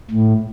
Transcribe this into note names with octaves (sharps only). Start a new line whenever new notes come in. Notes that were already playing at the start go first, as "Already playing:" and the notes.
A2